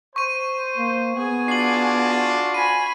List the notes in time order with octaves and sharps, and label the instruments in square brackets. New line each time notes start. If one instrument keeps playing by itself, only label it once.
[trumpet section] C5 [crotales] C#6 D#7
[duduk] A#3
[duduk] B3 [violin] G#4 G#5
[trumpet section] D4 F4 F#4 [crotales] C7 F#7
[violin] G#5 B5 [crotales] D#7